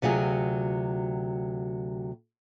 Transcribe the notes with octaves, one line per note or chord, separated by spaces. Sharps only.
D2 C3 F#3 F4 G#4